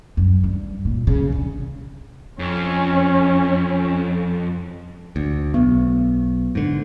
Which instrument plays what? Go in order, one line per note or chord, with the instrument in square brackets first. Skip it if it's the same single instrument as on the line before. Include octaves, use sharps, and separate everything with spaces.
[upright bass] F#2
G2
A#2
C#3
D3
[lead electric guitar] F2 [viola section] C#4
[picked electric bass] D2
[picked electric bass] B1 [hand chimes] B3
[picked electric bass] G#2 D3